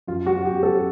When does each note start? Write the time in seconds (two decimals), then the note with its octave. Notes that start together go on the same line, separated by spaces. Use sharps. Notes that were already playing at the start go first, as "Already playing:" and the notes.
0.07 F#2 F4
0.26 F#4
0.45 F#2 G4
0.63 A4